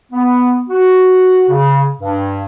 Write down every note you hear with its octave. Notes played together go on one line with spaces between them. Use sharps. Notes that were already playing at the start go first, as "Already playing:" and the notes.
B3
F#4
C#3
G2